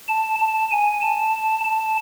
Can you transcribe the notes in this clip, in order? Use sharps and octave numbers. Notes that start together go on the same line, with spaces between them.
A5
A5
G#5
A5
A5